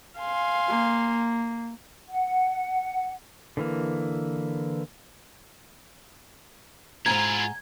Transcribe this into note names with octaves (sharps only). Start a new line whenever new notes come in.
F5 G#5 C6
A#3
F#5
D3 E3 A#3
G#2 E4 F4 G#5 A#5 G#6